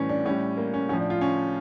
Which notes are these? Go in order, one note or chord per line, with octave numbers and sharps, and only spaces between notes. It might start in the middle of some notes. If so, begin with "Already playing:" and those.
Already playing: A2 E3 G3 C#4
D4
A2 G3 C#4
A#3
C#4
A2 F3 C#4
D4
F4
C#4